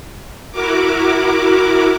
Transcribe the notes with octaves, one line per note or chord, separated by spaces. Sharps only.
E4 F#4 A#4 D6